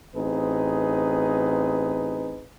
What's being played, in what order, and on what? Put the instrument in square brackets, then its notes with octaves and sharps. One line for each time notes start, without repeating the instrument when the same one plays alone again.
[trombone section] A1 C4 D#4 G#4 B4